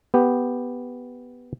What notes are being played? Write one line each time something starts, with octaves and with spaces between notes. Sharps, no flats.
B3 G4